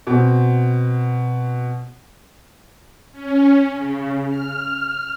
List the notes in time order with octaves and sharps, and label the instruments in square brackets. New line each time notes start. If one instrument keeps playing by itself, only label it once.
[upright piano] B2 C4
[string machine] C#4
C#3
F6